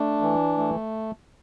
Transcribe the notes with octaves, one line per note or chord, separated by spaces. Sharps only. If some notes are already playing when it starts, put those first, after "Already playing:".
Already playing: A3 D4
E3
A3